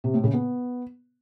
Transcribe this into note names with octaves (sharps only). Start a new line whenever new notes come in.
C3
A2
C#3
B3